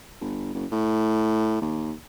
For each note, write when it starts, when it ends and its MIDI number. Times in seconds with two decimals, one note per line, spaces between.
0.21 0.52 31
0.54 0.66 30
0.72 1.61 45
1.62 1.93 39